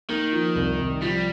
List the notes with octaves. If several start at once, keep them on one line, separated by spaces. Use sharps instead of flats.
D#3 A#3
F3
C2
C2
F3 G3